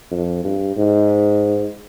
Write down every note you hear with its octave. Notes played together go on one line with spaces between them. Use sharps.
F2
G2
G#2